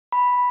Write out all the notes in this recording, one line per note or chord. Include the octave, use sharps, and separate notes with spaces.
B5